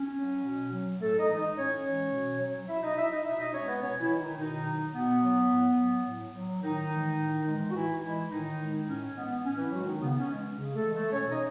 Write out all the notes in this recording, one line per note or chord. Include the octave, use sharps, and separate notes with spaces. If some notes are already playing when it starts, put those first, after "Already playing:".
Already playing: C#4
F#3
B2
F#3
A2 A3 A4
D#4 D#5
E3 G#3
D#4 D#5
A2 C#4 C#5
E3 G#3
B2
F#3
B2 E4 E5
D#4 D#5
F#3 E4 E5
D#4 D#5
B2 E4 E5
D#4 D#5
G#3 C#4 C#5
B3 B4
B2 C#4 C#5
E3 E4
G#3
D#3 D#4
B2 D#3 D#4
F#3
B2 B3
F#3
A2
F#3
A2
F#3
A2 D#3 D#4
E3 G#3
A2
E3 G#3
F#4
A2 E3 E4
E3 G#3 E4
A2 D#3 D#4
G#3
A2 C#4
E3 G#3 B3
A2 C#4
E3 E4
E3 F#3 G#3 F#4
D#3 D#4
C#3 B3
C#4
E3 G#3
C#3
A3 A4
E3 G#3
A3 A4
B2 C#4 C#5
D#4 D#5